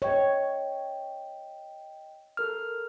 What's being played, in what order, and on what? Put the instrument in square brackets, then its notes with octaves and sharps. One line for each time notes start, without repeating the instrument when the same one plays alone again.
[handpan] C#5 [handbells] D#5 G5
[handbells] A4 A#4 F6